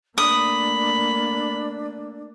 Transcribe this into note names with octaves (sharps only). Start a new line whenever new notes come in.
A3 A#3 D4 B5 D#6